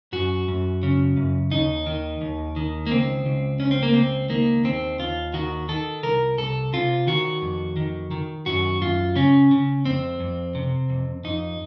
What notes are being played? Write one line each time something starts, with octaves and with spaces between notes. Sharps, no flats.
F#2 F#4
F#2
C#3
F#2
D#2 D#4
D#3
D#2
D#3
A#3
C#2 C4
C#2
C#2 C#4
C4
A#3
C#2 C4
D#3 A#3
D#2 C4
D#2 F4
D#3 F#4
D#3 A4
C2 A#4
C2 A4
C3 F4
D#3 F#4
F2
D#3
D#3
F#2 F#4
F#2 F4
C#3 C#4
C#3
F2 C4
F2
C3
F2
F2 D#4